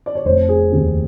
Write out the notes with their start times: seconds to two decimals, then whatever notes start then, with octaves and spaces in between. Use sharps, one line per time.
0.06 D5
0.15 C#5
0.25 F1 C5
0.49 G#4
0.72 D#2 C#3 G4